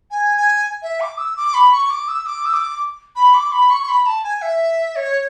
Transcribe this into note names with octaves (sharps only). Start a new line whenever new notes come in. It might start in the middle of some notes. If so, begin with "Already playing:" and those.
G#5
G#5
E5
D6
E6
D6
B5
C#6
D6
E6
D6
E6
D6
B5
D6
B5
C#6
C#6
B5
A5
G#5
E5
C#5